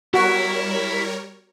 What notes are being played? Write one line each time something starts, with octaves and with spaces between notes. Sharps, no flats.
G3 E4 F#4 A#4 C#5